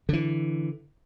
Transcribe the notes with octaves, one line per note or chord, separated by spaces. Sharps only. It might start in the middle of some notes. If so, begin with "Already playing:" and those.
D3 E3